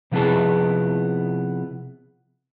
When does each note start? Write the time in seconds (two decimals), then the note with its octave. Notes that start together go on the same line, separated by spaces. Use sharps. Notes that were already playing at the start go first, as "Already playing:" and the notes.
0.12 C3 F3 B3 E4 G#4 A5